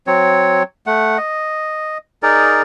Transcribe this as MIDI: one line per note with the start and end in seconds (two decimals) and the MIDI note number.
0.07 0.63 54
0.07 0.63 60
0.07 0.63 73
0.86 1.17 57
0.86 1.17 78
1.18 1.98 75
2.23 2.62 63
2.23 2.62 68
2.23 2.62 70
2.23 2.62 74